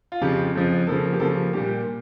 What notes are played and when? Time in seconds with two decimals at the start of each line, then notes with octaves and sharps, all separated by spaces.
0.12 F4
0.21 F2 C#3 F3 G4
0.54 F2 C#3 F3
0.87 C#3 F3 A#3 A4
1.13 G4
1.20 C#3 F3 A#3 A4
1.36 G4
1.53 A#2 G3 A#3 G4
1.86 A#2